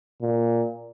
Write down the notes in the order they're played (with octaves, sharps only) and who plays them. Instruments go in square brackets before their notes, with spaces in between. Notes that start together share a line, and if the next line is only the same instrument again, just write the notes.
[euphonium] A#2